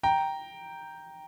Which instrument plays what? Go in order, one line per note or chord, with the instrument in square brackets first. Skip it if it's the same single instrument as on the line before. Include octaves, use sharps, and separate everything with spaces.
[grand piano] G5 A#5